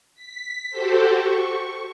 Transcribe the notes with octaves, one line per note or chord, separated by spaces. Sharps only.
B6
F#4 G4 A4 C5
C#6